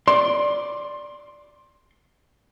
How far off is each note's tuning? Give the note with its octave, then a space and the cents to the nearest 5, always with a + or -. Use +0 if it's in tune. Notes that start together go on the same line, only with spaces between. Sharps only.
D5 +0 C6 +20